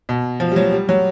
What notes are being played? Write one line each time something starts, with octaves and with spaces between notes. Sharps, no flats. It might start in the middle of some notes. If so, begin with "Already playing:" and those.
B2
F3
G3
F#3
G3
F#3